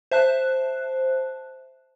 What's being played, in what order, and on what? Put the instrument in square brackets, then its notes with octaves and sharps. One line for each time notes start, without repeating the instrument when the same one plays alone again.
[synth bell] C5 E5 A5 F#6